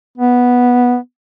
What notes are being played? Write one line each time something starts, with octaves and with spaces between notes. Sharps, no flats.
B3